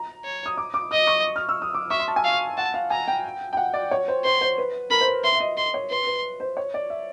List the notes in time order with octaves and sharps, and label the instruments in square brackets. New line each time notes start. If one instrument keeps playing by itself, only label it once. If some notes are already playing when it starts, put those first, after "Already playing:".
Already playing: [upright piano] A#5
[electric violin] C#5
[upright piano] D#6
D6
D6
[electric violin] D#5 [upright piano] D#6
[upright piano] C#6
F6
E6
D#6
D6
[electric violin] E5 [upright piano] C#6
[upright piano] C6
A5
G#5
[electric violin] F5
[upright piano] F#5 [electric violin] A5
[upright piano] F5
[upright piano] G#5 [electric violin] A#5
[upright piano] G5
G5
F#5
D5
C#5
C5
[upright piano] C5 [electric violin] C6
[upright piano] C5
B4
[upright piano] A#4 [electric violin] B5
[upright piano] C5
B4
[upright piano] E5 [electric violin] C6
[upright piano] E5
D#5
[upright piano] D#5 [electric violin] C6
[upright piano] C#5
[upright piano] B4 [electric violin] C6
[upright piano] B4
C5
C#5
D5
E5